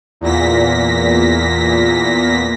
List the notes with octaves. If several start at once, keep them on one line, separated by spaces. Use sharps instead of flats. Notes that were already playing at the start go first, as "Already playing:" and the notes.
E2 A#2 A#6 B6